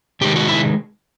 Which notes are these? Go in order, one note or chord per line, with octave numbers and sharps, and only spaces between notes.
C3 D#3 G#3 G4
F#4
E4